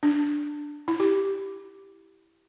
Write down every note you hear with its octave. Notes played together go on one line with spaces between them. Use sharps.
D4
E4
G4